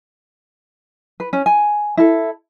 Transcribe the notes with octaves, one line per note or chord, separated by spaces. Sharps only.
B4
C#4
G#5
E4 A4